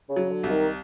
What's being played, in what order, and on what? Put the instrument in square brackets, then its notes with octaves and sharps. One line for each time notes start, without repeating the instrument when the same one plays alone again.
[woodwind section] C#3
[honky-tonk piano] F#3
[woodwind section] D3
[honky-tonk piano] C2
[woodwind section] D#3